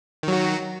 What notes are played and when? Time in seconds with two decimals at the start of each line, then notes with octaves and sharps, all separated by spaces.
0.23 D#3
0.28 F#3
0.32 F#4